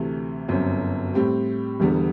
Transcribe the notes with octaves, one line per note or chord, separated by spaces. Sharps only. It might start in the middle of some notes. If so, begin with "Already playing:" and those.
Already playing: D2 C3 E3 A3
G1 F#2 F#3 C4
A2 G3 C4 G4
E1 E2 D3 G3 B3